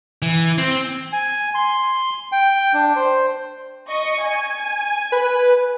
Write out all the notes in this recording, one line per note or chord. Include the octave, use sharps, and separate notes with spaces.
E3
C4
G#5
C6
G5
D4
C5
D#5 C#6
G#5
B4